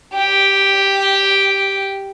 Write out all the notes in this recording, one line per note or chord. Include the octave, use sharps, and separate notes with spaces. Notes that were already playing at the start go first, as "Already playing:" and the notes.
G4